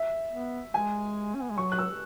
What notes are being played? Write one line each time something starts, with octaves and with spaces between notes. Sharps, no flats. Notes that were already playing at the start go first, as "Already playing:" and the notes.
Already playing: E5
B3
G#3 G#5
C#4
B3
G#3
F#3 C#6
F#6
E6